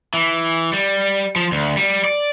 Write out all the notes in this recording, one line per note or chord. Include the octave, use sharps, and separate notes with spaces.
E3
G3
F3
D2
G3
D5